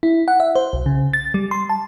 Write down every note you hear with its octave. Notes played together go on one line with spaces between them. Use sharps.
E4
F#5
E5
C5
B1
C#3
A6
G3
C6
A5